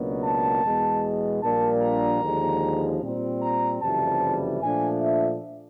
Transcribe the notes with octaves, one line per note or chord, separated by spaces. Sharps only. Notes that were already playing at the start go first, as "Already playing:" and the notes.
Already playing: C#2 B2 F#3 A#3 D4
A5
E2 B2 G#3
A#1 A#2 G3 A#3 D4 A5
A#5
D#2 D3 F3 G#3
A#2 G3 C4
A#5
F#1 F2 C3 E3 G3 A5
A#2 F3 A3 D4 G#5
E5